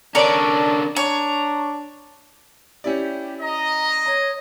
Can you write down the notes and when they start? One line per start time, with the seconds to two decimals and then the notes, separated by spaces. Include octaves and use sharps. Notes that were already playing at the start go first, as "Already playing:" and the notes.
0.15 D3 C#4 D4 A#4 C#5 D5
0.96 D4 C#5 A#5
2.84 C#4 E4 G4 D5
3.41 D#5 A#5
4.06 C#5 A#5